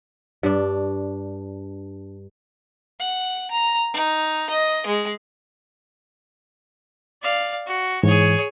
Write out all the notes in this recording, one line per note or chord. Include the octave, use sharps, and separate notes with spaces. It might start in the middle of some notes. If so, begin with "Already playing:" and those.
G2 D4
F#5
A#5
D#4
D#5
G#3
D5 F5
F#4
G#2 E3 G#4 C#5